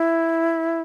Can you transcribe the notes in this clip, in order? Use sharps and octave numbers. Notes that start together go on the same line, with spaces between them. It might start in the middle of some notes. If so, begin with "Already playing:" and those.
Already playing: E4